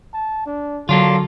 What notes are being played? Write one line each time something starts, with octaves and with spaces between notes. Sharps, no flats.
A5
D4
D3 F#3 A#3 D4 F4 A4